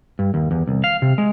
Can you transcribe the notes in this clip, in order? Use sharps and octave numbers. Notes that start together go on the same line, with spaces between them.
G2
D#2
E2
C2
F5
C3
G#3